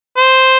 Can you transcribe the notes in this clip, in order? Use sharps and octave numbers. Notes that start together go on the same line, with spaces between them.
C5